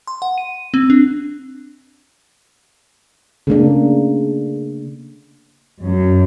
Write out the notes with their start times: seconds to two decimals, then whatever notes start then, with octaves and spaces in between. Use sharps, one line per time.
0.07 C6
0.22 F#5
0.38 D#7
0.74 C4
0.90 D4
3.47 C#3 A3 A#3 D4
5.83 F#2